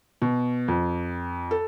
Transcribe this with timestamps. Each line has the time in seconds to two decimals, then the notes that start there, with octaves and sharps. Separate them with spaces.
0.22 B2
0.68 F2
1.51 A4